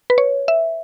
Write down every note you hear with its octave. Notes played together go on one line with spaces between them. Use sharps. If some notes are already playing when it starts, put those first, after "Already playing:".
B4
C#5
E5